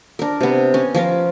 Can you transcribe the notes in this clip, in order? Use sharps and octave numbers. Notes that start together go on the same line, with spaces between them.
D4 A#4
C3 B3
C#4
F3 F4 A#4